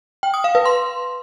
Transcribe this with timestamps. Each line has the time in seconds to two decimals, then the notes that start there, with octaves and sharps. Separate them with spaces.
0.23 G5
0.34 D#6
0.44 F5
0.55 B4
0.65 C6